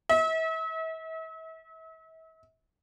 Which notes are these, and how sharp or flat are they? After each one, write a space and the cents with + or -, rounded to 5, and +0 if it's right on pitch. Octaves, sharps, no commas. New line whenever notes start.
E5 -40